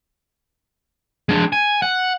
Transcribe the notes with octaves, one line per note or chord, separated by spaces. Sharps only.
G#3 D4
G#5
F#5